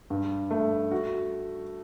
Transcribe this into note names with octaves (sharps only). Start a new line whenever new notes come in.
G2
A3
F#4